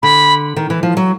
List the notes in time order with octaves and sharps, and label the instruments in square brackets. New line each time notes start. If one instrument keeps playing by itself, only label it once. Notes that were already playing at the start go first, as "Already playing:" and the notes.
[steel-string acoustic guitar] D3 [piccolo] B5
[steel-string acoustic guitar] D#3
E3
F3
F#3